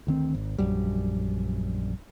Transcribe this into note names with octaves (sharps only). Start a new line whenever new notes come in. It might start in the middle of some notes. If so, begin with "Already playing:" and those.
D2 D#3 C4
G#1
A#1 F#2 G3